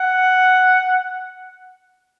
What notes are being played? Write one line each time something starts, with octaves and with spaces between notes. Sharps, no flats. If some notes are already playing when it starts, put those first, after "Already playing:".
Already playing: F#5